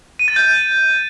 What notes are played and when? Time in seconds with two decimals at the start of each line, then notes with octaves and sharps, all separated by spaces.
0.19 D#7
0.28 A6
0.36 G6